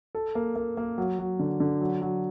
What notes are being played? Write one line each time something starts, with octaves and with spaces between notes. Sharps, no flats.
A4
A#3
A#3
A#3
F#3
F#3
D3
D3
F#3
F#3